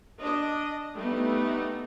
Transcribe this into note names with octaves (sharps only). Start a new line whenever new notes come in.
D4 D#5
G3 A3 B3 D#4